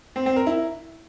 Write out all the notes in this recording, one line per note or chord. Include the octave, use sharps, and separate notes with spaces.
C4
C4
A#4
E4